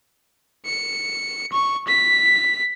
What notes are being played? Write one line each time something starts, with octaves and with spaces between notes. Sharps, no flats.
C#7
C#6
B6